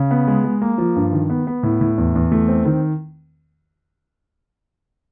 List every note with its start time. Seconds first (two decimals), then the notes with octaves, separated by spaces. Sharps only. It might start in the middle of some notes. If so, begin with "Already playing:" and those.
Already playing: C#3
0.11 B3
0.28 G#3
0.44 G#3
0.62 A#3
0.78 F3
0.96 G2
1.13 D#3
1.30 B3
1.47 B3
1.63 A2
1.81 A2
1.98 E2
2.15 E2
2.32 A3
2.48 C4
2.65 D#3